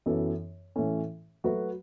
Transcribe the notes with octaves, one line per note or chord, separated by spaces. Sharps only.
F#2 E3 B3 A4
A2 E3 C#4 A4
F#3 A3 F#4 B4